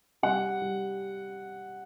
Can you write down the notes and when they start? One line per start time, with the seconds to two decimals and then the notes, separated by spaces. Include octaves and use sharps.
0.23 G3 F#5
0.62 G3